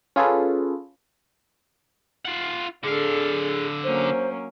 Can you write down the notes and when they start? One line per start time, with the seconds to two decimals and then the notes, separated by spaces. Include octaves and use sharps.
0.16 C#4 F4 G#4 A4 B4
2.25 F4 F#5
2.84 D3 D4 G#4 A4 F5
3.84 F#3 A#3 C#4 C5